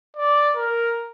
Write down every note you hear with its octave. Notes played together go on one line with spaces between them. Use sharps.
D5
A#4